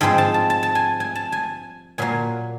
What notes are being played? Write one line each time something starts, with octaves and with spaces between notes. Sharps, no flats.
G#2 F3 G#3 C4 G5
A5
A5
A5
A5
G#5
G#5
A5
G#5
A#2 F#3 A#3 G#5